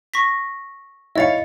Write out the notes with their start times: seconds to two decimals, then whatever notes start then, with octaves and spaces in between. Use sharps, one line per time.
0.14 C#6 A#6 B6
1.16 E4 C#5 D#5 F5 A6 C#7